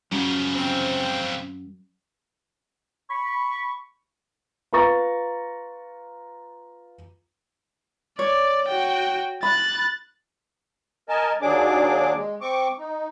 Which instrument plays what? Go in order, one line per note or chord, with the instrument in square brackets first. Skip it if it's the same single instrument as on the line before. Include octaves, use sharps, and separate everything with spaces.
[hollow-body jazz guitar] F#2 [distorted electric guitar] C#3 F3
[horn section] C4
[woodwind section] B5 C#6
[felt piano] F4 B4 A#5 C#6 A6
[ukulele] C#5 [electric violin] D5
[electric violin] F#4 G5
[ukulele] B5 [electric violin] F#6 A6
[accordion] A#4 D#5 G#5 A5
D#2 F#3 D4 G#4 D6
G#3
C4 C#6 D6
D#4